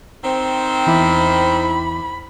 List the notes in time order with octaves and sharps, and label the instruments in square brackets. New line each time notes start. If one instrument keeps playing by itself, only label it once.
[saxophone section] D#3 C4
[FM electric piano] E2 E4 D6 [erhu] B5